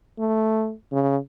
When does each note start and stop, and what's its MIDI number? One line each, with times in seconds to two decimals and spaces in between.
0.19 0.72 57
0.92 1.17 49